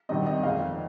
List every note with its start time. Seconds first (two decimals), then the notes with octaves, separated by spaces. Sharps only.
0.09 G#1 G2 D#3 G3 C4 D#5
0.27 D#5
0.43 G1 F2 D#3 G#3 F5